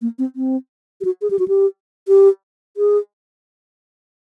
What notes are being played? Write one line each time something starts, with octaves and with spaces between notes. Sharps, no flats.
A#3
C4
C4
G4
F#4
G#4
G4
F#4
G4
G4
G#4